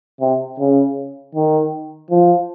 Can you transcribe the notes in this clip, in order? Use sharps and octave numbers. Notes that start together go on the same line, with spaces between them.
C3
C#3
D#3
F3